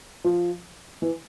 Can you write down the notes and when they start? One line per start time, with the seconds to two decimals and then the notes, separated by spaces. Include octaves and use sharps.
0.24 F3
1.02 E3